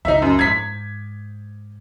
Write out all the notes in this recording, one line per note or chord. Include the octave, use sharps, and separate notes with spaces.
C#2 D#4 E5
F#2
G#2 G#6 B6